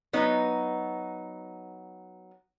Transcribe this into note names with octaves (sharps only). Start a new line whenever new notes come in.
F#3 B3 D#4